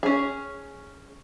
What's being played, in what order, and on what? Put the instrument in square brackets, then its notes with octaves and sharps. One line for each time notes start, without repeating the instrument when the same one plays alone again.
[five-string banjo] C#4 G#4